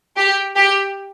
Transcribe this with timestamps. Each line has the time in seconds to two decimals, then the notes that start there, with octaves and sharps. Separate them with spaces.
0.16 G4
0.56 G4